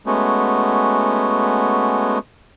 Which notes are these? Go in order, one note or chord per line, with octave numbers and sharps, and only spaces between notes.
G#3 A3 B3 C#4 F#4